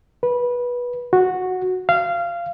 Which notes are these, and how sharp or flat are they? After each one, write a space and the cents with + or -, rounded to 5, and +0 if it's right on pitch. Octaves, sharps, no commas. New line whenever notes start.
B4 -20
F#4 -10
F5 -20